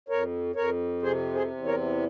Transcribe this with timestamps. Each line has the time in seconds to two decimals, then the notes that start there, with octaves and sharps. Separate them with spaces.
0.09 F2 A#4 C#5
0.55 F2 A#4 C#5
1.02 C3 G#4 C5
1.34 G#4 C5
1.50 E2
1.65 A#4 C#5